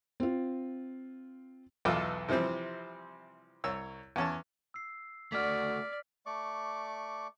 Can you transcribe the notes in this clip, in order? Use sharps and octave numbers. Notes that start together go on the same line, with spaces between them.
C4 F4
B1 E2 F4 A4 B4 D6
C3 E3 F3 G3 C4
C2 C#5 E6
E2 C#4 A5
E6 C7
A3 F#4 D5 F6 B6
A3 D5 C#6 D6